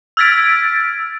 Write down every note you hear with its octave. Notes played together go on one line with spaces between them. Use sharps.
E6 F6 G#6 A6 B6 D7